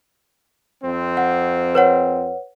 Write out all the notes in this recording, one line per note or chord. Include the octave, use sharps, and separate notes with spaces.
F2 C4
F#5
B4 C#5 F#5